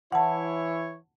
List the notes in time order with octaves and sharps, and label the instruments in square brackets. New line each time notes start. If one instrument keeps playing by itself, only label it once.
[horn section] E3 E4 C#5 [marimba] F#5 A5